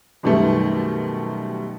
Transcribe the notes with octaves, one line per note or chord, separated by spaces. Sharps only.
F#2 B2 D#3 G3 A3